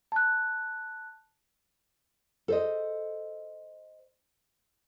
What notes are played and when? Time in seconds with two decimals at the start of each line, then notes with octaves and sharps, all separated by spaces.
0.12 A5 F#6
2.48 A4 C5 D#5